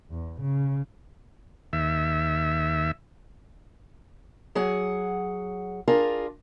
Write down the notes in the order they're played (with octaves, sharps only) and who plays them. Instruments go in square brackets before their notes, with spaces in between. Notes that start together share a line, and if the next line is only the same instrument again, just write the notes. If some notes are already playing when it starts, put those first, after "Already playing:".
[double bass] E2
C#3
[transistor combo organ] D#2 E5
[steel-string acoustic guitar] F#3 G#4 F#5
D4 F4 G#4 A#4